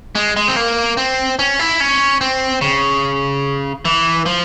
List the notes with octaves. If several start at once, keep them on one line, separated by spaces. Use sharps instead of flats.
G#3
G#3
C4
A#3
C4
C#4
E4
C#4
C4
C#3
E3
F3